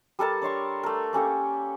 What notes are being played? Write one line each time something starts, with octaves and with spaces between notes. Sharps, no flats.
G3 A4 A#4 A5
D4 C#5 C6 C#6
A3 A#4
A#3 C#4 G4 A4